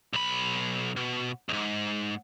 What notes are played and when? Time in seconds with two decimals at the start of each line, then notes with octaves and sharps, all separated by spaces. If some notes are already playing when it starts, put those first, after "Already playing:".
0.13 B1 B5
0.96 B2
1.49 F2 G#2